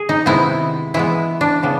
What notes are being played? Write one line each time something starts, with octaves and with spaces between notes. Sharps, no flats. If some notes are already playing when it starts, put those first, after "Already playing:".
Already playing: G#4
D#4
C3 D#3 G#3 B3 E4
E3 G#3 B3 E4
D4
C#3 E3 G3 B3